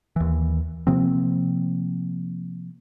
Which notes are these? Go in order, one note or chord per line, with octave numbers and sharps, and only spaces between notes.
D#2 E3
C3 F3 A#3 C4